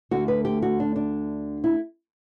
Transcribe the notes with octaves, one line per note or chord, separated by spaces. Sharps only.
D2 D3 A3 F#4
B4
G4
F#4
D4
D4
E4